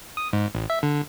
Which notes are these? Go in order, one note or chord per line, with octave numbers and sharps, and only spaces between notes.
D#6
G#2
A1
E5
D3